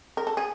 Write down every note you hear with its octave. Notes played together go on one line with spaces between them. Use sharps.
A#4
A4
G#4